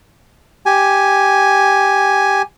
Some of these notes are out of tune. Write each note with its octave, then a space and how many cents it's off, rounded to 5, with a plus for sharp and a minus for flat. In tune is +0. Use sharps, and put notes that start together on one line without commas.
G4 +0 G#5 +0